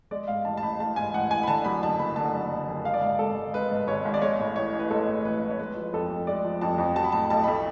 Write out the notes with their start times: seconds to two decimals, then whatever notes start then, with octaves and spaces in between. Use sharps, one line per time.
0.11 G#3 D5
0.28 G#2 F5
0.45 A1 A5
0.57 A5
0.62 A1 B5
0.79 G#3 A5
0.96 G#2 G#5
1.13 A1 F#5
1.30 A1 G#5
1.43 B5
1.47 D3 A5
1.65 F#2 B5
1.82 F#1 A5
1.99 F#1 B5
2.16 D3 A5
2.33 F#2
2.51 F#1
2.68 F#1
2.84 G#3 F5
2.94 D5
3.01 G#2 F5
3.19 G#1 A4
3.36 G#1
3.53 G#3 B4
3.71 G#2
3.87 G#1 C#5
4.05 G#1
4.14 D5
4.22 G#3 C#5
4.39 A2
4.56 A1 C#5
4.73 A1
4.79 B4
4.90 G#3 A4
5.08 A2
5.24 A1 B4
5.42 A1
5.50 C#5
5.59 G#3 B4
5.76 F3
5.93 F2 A4
6.10 F2
6.27 G#3 D5
6.45 F3
6.61 F2 A5
6.78 F2
6.96 F#3 A5
7.04 B5
7.12 A2 A5
7.30 B1 A5
7.44 A3 B5